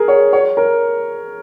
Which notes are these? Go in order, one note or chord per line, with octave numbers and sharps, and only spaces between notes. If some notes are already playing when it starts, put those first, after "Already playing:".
Already playing: G#4 A#4
C#5
C#5
A#4